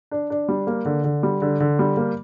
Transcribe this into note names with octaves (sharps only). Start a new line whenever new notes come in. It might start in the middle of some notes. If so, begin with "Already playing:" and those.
D4
D4
G3
A#3
D3
D3
G3
D3
D3
G3
A#3